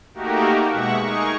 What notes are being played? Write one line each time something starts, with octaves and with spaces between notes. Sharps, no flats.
A3 A#3 D#4 F#4 G4 A#4
B2 G#3 E5 F#5 C#6
D#4 G#4 A#4 C#6